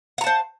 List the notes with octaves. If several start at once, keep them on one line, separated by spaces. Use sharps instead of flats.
C5 F#5 A5 A#5